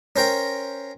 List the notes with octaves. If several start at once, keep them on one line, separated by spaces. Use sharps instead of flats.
C#4 A#4 C5 G5 A#5